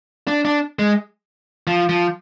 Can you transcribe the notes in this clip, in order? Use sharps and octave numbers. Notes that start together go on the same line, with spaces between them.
D4
D4
G#3
F3
F3